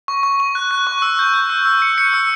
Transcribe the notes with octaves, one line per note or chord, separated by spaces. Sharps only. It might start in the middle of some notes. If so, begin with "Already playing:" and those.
C#6
C#6
C#6
F#6
F#6
C#6
E6
G6
G6
E6
E6
C#7
C#7
E6